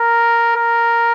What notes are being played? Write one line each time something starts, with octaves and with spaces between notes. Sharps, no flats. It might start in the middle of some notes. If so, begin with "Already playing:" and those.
Already playing: A#4
A#4